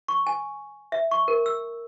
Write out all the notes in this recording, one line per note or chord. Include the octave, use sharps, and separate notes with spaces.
C#6
G#5
E5
C#6
A#4
E6